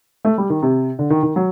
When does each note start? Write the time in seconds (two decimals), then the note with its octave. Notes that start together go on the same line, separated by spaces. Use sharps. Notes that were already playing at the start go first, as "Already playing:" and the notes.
0.25 A3
0.38 G3
0.50 D#3
0.62 C3
0.99 D3
1.10 D#3
1.23 D#3
1.36 F#3